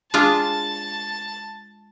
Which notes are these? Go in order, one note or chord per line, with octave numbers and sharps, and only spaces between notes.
G#3 D4 F4 A5